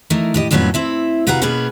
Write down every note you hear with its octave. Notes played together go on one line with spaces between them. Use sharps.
E3 A3 D#4 A#4
A2 G4 D#5
F2 A2 F#3 B3 C#4 E4
C4 E4 E5
C3 F#4 B4 F5 F#5 A#5
B2 A#3 B3 C#4 G#4 B4